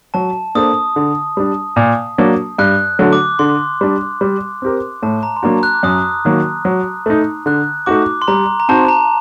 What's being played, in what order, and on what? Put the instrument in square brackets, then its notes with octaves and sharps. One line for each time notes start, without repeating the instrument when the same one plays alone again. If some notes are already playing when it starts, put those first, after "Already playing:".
[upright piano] F#3 [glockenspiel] A5
[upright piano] A#3 D4 A4 C5 [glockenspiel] D#6
[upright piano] D3
G3 D4
A#2
F#3 A#3 D4
[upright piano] G2 [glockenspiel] F#6
[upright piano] D3 F#3 A3
[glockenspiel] D6
[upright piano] D3 [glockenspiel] C6
[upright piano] G3 D4
G3
C4 G4 A#4
[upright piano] A2 [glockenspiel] A5
[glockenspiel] A#5
C6
[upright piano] F#3 A#3 D4 F#4 [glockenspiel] A#5
[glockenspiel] F#6
D6
[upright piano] F#2 [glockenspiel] D#6
[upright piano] D#3 F#3 A#3
F#3
A3 D#4
[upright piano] D3 [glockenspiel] F#6
[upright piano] A3 D#4 F#4 [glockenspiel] D6
[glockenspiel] C6
[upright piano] G3 [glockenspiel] A#5
[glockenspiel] A#5
[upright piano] C4 D#4 F#4 C5 [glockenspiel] A5
[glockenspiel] A#5